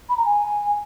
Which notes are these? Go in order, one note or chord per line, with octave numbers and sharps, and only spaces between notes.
B5
A#5
G#5